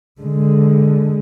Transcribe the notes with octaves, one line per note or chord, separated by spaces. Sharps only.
D3 G#3